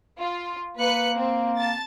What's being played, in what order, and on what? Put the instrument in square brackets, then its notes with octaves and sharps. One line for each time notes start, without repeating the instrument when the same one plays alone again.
[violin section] F4
[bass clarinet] A#3 [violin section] B4 F#6 C#7
[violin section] C4
A5 A6